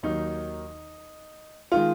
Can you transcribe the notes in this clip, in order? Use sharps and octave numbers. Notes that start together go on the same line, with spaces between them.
D#2 D#3 F#3 D#4
D#3 G#3 F4